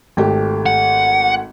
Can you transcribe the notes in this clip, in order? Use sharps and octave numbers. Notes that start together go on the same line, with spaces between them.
G#1 A3 G4
F#5